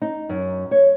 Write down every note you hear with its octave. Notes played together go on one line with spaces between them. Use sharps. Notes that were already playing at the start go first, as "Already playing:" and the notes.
D#4
F#2
C#5